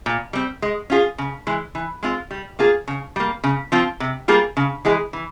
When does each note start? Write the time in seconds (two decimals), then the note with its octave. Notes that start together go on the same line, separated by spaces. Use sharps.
0.06 A#2
0.33 G3 C4
0.62 G#3
0.90 C#4 F4 G#4
1.18 C#3
1.47 E3 G#3
1.75 E3
2.03 G#3 C4 F4
2.31 G3
2.59 A#3 F4 G#4
2.88 C#3
3.16 G3 A#3
3.44 C#3
3.72 F3 C4 F4
4.00 C3
4.28 G3 A#3 F4 G#4
4.57 C#3
4.85 E3 G#3 E4 G#4
5.13 E3